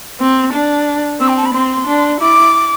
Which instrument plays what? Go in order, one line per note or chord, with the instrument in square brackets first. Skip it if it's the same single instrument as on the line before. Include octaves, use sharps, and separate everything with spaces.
[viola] C4
D4
[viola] C4 [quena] E6
[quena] G5
A5
B5
[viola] C4 [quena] C6
[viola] D4
[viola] E4 [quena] D6